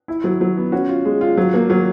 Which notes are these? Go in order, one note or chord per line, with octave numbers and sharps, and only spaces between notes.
E4
F#3
F#3
B3
C#4 F#4
F4
G#3
F4
F#3
A#3
F#3